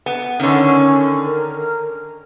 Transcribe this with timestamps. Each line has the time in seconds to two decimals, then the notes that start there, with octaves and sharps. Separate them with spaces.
0.06 B3
0.40 D3 D#3 C#4
1.24 A#4